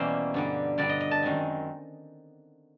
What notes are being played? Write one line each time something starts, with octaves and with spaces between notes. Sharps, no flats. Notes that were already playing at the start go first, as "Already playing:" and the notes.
Already playing: E2 B2 G3 A#3 C#4 C5 E5
G2 D3 G3
G2 D3 G3 D5
D#5
D#5
A5
F#2 D#3 G#3 C4